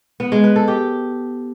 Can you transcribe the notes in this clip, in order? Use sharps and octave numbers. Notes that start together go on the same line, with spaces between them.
B3
G#3
B4
A4
G4